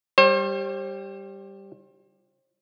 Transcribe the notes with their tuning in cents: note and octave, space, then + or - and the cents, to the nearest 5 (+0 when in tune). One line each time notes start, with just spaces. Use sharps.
G3 +0 C5 +40